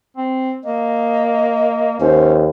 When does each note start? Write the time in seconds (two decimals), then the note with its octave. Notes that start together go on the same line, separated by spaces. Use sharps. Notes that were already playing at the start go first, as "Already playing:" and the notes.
0.17 C4
0.64 A#3 D#5
2.01 D#2 C#4 C5